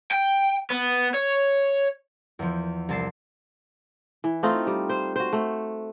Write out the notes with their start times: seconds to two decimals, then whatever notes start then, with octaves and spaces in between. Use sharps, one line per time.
0.12 G5
0.70 B3
1.14 C#5
2.39 E2 F3
2.89 C2 A5 C7
4.24 E3
4.43 A3 C4 D#4 F4
4.67 G3
4.89 C5
5.16 F#4 C5
5.33 A3